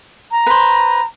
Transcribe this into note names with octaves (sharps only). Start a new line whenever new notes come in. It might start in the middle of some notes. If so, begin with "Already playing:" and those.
A#5
B4 C5